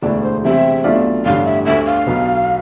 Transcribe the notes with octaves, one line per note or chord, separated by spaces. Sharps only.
E1 D2 D3 A3 E4 D5
C5
E2 C3 G3 C4 E5
B1 B2 A3 D4 F4
A1 G2 D3 F5
E5
D2 D3 A3 E5
F5
B1 B2 B3